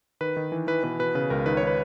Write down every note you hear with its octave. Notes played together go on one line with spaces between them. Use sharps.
D#3 B4
D#3
E3
E3 B4
B2 B4
B2 B4
C#3 B4
C#2 A#4
D#3 B4
C#5
D#3 B4